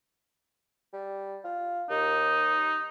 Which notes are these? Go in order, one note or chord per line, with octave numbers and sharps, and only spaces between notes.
G3
F4
D#2 D#4